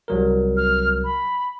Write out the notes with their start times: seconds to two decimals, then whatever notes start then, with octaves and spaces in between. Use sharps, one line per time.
0.08 C2 F#3 A#4
0.57 F6
1.04 B5